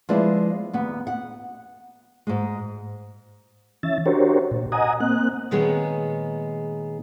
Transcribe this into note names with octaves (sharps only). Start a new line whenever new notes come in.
F3 G#3 B3 E4 D5
D#2 B3
F#5
G#2 G#3
E3 C#4 E5 A6
D4 F#4 G4 A#4 C5 C#5
A#2
D#5 F#5 G#5 A#5 D#6
A#3 C4 F#6
A#2 D#3 G#3 B3 G#4 C#5